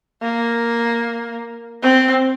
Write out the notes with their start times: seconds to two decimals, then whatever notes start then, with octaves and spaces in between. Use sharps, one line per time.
0.23 A#3
1.83 C4